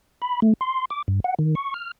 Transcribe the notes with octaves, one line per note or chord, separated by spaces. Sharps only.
B5
A3
C6
D6
G2
F#5
D#3
C#6
F6